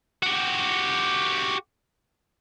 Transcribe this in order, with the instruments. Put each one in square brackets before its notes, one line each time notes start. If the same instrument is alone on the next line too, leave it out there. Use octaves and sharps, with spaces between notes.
[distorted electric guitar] F#4 G4